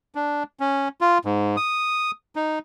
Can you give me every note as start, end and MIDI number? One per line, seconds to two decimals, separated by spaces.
0.15 0.43 62
0.60 0.88 61
1.01 1.18 65
1.25 1.56 44
1.57 2.11 87
2.36 2.59 63